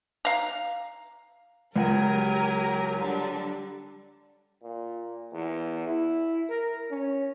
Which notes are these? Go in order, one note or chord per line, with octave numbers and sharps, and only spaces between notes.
F5 A#5
C#2 F#3 G4 A#4 G#5
D3 G3
A#2
E2
E4
A#4
C#4